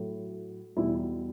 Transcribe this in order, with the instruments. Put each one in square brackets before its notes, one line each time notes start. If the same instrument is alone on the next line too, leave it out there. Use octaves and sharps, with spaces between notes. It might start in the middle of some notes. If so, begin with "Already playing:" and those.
Already playing: [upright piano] A2 F#3
E2 B2 G3 E4